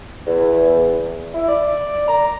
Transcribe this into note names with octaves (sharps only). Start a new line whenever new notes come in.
E2
E4
D5
A#5